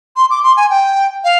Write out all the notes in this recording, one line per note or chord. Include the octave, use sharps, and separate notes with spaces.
C6
D6
C6
G#5
G5
F5